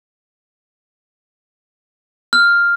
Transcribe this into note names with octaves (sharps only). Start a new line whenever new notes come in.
F6